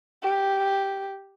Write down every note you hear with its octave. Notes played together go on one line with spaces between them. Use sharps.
G4